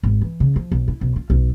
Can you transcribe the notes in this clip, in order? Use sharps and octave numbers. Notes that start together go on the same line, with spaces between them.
G#1
E3
C#3
F3
B1
E4
B1
F4
B1